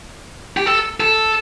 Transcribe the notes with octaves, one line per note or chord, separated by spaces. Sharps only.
G4
A4
A4